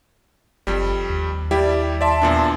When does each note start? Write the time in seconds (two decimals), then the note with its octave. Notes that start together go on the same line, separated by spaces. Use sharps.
0.67 F#1 F2 G3
1.10 D#2
1.51 G3 D4 E4 G4 D5 G5
2.01 D5 E5 A5 C6
2.22 E2 A#2 D4